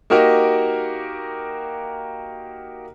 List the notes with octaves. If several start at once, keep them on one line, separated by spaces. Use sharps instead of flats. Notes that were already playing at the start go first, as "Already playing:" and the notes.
A#3 D#4 F#4 G4 A#4